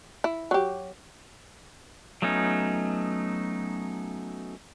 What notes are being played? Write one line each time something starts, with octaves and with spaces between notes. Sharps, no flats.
E4
F#3 G4
F#3 A3 B3 C#4 D#4